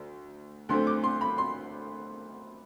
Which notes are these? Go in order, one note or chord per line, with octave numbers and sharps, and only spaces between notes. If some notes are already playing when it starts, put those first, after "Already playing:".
Already playing: D2
D2 D3 A3 C4 C6
D6
C6
B5
C6